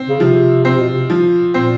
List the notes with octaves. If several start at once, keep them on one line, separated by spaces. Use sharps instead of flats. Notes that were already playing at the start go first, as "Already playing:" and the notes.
Already playing: C4
C#3
C3 F3
C3 C4
B2
C3
F3
A#2 C4